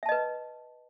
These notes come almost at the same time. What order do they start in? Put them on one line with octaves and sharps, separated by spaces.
E5 A5 D#5 B4